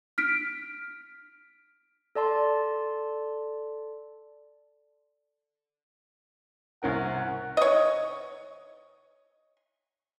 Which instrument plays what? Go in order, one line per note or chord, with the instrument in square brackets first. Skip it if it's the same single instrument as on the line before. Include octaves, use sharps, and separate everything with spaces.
[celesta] F6 B6 D7
[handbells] A4 D5 A5 C6
[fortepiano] C2 C#4 A#4 [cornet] F#5
[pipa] C#5 D#5